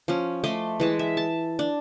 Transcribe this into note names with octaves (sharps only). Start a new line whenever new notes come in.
F3 C#4
A3 D#5 C6 D6
E3 G#3 A5
E5
A5
D4